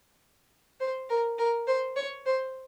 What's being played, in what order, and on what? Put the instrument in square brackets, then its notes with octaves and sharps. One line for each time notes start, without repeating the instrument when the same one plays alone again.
[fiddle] C5
A#4
A#4
C5
C#5
C5